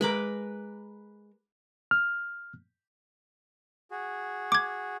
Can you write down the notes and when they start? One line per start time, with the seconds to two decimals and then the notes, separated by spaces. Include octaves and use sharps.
0.01 G#3 A#4 B4 B5 D6
1.91 F6
3.91 F#4 G#4
4.52 D6 G#6